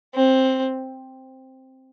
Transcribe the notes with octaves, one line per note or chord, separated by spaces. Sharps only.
C4